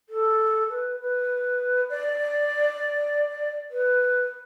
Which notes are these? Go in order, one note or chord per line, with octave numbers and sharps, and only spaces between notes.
A4
B4
B4
D5
B4